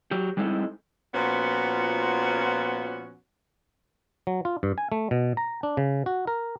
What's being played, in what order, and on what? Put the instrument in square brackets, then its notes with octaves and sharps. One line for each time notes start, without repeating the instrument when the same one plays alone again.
[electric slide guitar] F#3 G4
G3 G#3 C4 D#4 E4 A4
[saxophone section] A#2 F3 B3 C#4 F#4
[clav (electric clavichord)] F#3
F4
G2
G#5
A3
B2
A#5
D4
C#3
F#4
A#4